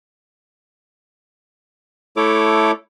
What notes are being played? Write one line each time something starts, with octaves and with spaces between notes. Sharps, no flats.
A3 E4 A4 C#5 D6